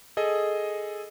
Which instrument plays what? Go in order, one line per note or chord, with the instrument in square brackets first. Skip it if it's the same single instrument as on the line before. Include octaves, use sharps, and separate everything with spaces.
[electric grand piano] G#4 A4 D#5